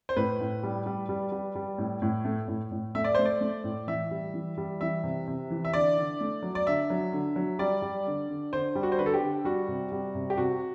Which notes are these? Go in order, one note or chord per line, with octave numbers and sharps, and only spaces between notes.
C5
A2 B4
A2
G3
G3
G3
G3
G3
A2
A2
A3
A2
A2
A3 E5
D5
A3 C5
D5
A3
A2
E3 E5
G3
E3
G3
E3 E5
C3
C3
E3
E5
D3 D5
D3
A3
F#3
D5
D3 E5
F#3
D3
F#3
G3 D5
G3
D3
D3
D3 C5
G3
F#4
C5
D3 B4
A4
G4
D3
G3 F#4
C3
G3
C3
G4
C3 F#4